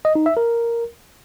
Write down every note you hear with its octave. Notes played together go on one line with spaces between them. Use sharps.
D#5
D#4
E5
A#4